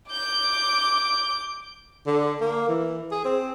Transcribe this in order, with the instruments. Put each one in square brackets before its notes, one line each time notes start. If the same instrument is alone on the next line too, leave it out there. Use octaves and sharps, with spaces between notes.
[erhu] D6 [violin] G6
[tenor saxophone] D3
A#3
E3
G#4
C4